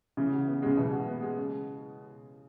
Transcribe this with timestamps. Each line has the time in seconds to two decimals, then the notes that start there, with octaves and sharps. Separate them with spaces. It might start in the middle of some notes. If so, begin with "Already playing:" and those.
0.17 C#3 E3
0.32 F#4
0.47 B3
0.62 C#3 G#3
0.77 B2 E3
0.92 F#4
1.07 B3
1.22 G#3
1.37 C#3